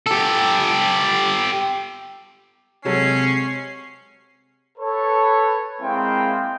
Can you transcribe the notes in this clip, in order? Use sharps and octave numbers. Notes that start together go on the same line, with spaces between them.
G4 A4
C3 F#3 G#3 C#4 A4 C7
A4 B4 C#5
G#3 A#3 C4 E4 F5 G5